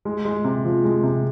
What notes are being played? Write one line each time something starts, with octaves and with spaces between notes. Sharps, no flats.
G#3
G#3
C3
F3
G#3
C3